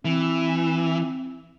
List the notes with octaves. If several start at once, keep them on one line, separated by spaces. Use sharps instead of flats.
E3 C4